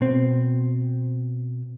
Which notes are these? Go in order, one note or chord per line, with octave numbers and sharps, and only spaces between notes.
B2 C4